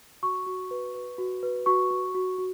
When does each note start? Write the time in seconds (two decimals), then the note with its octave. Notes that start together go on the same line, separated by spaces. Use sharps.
0.23 F#4 C#6
0.46 F#4
0.71 B4
0.95 B4
1.18 F#4
1.43 B4
1.66 F#4 C#6
1.90 F#4
2.15 F#4
2.38 F#4